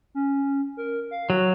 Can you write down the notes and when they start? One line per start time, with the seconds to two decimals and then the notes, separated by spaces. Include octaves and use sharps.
0.15 C#4
0.77 A#4
1.11 F5
1.30 F#3 F#4